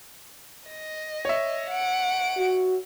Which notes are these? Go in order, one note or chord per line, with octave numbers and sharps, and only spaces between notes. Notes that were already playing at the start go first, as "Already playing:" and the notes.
D#5
C#5 E5
F#5 D7
F#4